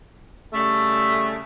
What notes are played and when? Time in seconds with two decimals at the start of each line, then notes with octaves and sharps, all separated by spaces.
0.54 C#3 G3 A3